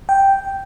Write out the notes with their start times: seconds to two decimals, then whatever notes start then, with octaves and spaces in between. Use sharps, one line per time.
0.09 G5